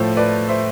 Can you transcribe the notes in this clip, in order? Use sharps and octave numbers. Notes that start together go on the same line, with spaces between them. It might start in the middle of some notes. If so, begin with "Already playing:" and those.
Already playing: A2 F3 A3 A4 C5
B4 D5
C5 E5